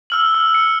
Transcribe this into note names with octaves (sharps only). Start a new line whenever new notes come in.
E6 F6 F#7
E6
C#7